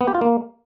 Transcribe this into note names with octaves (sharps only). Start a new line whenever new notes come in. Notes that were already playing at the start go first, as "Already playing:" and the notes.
B3
G4
F4
A#3